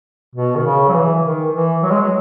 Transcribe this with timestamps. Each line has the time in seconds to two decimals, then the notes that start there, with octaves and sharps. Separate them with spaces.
0.36 B2
0.56 D#3
0.64 C#3
0.89 F#3
0.93 E3
1.23 D#3
1.53 E3
1.83 F#3
1.92 G#3
2.01 F#3